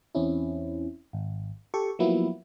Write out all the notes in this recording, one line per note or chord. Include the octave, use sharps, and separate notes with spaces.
E2 C4 C#4 E4
G#1
G4 A4 C#6
F3 F#3 A#3 B3 E4